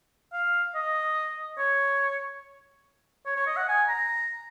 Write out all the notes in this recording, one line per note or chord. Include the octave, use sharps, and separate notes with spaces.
F5
D#5
C#5
C#5
C#5
D#5
F#5
G#5
A#5